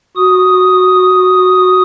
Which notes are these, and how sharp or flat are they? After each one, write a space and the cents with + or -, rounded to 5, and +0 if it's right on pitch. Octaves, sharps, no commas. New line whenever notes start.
F#4 +0 D#6 +0